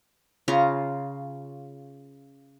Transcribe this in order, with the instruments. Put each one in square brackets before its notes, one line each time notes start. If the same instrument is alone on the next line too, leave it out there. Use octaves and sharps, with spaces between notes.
[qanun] C#3 F4 A#5